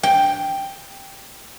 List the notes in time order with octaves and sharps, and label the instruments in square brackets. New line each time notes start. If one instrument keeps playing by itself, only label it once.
[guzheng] G5